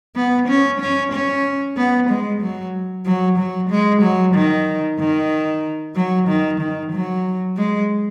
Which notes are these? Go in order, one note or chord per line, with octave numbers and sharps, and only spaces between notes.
B3
C#4
C#4
C#4
B3
G#3
F#3
F#3
F#3
G#3
F#3
D#3
D#3
F#3
D#3
D#3
F#3
G#3